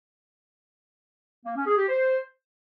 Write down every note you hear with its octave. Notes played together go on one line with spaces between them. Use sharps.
A#3
C#4
G#4
G4
C5